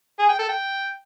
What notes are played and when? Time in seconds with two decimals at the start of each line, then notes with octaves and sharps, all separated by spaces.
0.20 G#4
0.29 G5
0.39 A4
0.49 G5